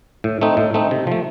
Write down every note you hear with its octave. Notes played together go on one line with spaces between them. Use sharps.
A2
A3 C4 D#4
A2
A3 C4 D#4
C3
F3 A3